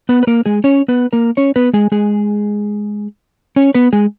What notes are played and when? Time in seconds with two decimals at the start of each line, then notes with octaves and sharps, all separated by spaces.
0.09 B3 B4
0.23 B4
0.27 A#3 A#4
0.46 G#3 G#4
0.64 C#4 C#5
0.88 B3 B4
1.13 A#3 A#4
1.37 C#4 C#5
1.56 B3 B4
1.73 G#3 G#4
1.92 G#3 G#4
3.56 C#4 C#5
3.74 B3 B4
3.93 G#3 G#4